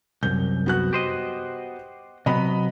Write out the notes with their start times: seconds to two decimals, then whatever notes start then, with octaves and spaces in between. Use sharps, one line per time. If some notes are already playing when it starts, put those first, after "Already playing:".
0.23 C2 F#2 G6
0.66 B3 F#4 F#6
0.93 G4 C5 D#5
2.26 C3 F#3 B3 D#5 B5